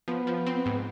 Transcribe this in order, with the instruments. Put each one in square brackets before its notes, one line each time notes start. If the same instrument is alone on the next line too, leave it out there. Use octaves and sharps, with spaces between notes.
[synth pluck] F3 [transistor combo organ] B3
[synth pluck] F3
C4
G#2